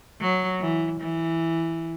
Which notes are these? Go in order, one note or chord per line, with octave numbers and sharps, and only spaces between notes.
F#3
E3
E3